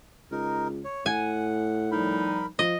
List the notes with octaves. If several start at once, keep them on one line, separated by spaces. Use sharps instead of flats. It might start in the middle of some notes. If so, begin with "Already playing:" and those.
C#2 D#4 A#4
C#5
A2 F#5 G#5
F3 G3 D#4 A#4 B5
F3 D#5